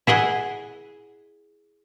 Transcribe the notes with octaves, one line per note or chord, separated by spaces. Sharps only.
E4 G#4 D#5 F#5